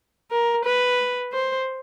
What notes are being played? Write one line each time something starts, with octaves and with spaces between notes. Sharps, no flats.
A#4
B4
C5